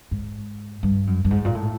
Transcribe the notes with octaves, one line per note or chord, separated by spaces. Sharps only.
G#2
G2
F#2
G2
G#2
A#2
A2